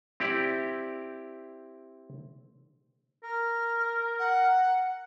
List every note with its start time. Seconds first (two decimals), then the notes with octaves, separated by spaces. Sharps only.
0.20 C4 E4 G4 D5
3.24 A#4 F6
4.19 F#5